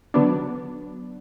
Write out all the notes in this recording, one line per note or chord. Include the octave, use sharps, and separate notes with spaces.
D3 F#3 B3 D4